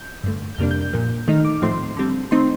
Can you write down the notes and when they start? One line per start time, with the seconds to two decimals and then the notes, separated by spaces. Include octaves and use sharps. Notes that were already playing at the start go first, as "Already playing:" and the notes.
Already playing: G6
0.24 G2 D3 A3
0.55 G6
0.58 F2 C3 G3 A#3 D4 F6
0.71 G6
0.81 G6
0.93 A#2 F3 A#3
1.28 D#3 A3 D#4 F6
1.45 D6
1.62 A2 F3 A3 C4 C6
1.97 D3 G3 C4
2.31 D#3 A3 C4 D#4 C6